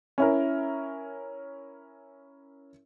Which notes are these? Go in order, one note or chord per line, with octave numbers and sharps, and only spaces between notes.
C#4 E4 A#4